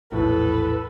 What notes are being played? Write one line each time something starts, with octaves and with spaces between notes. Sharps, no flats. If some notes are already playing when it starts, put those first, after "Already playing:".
A#1 E2 A2 A4 B4